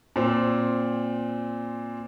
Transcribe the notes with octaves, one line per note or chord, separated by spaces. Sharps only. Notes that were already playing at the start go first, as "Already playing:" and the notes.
A#2 C4